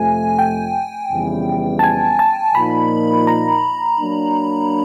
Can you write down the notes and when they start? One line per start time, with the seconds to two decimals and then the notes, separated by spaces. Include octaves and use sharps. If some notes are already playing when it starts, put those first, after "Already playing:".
Already playing: F2 C3 F3 A3 G#5
0.39 G5
1.11 F2 C#3 E3 G3 B3
1.79 A5
1.83 G#5
2.19 A5
2.55 A#2 F3 A#3 D#4 B5
3.27 A#5
4.00 F#3 A#3 D4